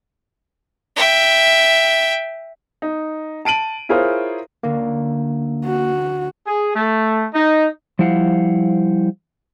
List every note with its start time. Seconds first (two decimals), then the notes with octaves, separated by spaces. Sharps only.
0.96 E5 G5
2.82 D#4
3.45 A5 D7 D#7 F#7
3.89 E4 F4 G#4 A#4 C5 C#5
4.63 D2 D3 A#3 C#4
5.66 F#4
6.45 G#4
6.75 A3
7.33 D#4
7.99 F3 G3 E4 C5 F5 F#5